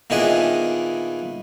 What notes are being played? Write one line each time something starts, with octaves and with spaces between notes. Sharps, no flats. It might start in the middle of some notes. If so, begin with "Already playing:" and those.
A#2 D#3 B3 D4 E4 G#4